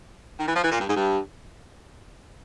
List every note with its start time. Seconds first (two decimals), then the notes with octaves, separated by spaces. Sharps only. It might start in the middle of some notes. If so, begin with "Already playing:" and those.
0.39 D#3
0.48 E3
0.55 F3
0.64 E3
0.72 A#2
0.80 G2
0.88 G#2
0.96 G2